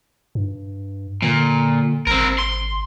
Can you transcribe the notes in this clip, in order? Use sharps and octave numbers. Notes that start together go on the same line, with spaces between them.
G2
A#2 D3
G#1 C4 A#4
C6